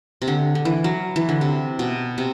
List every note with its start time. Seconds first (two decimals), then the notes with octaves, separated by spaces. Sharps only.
0.22 C3
0.28 D3
0.55 D3
0.65 E3
0.84 F#3
1.16 E3
1.29 D3
1.41 C3
1.79 B2
2.18 C3